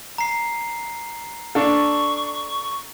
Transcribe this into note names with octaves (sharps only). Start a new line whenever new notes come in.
A#5 C7
D4 A4 C#6